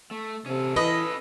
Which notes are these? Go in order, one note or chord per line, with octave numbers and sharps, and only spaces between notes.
A3
C3 C#4 A4
E3 B4 D#5